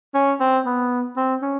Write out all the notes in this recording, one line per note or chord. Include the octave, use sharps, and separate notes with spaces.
C#4
C4
B3
C4
C#4